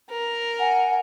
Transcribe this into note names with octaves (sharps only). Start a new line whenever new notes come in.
A#4
F#5 G#5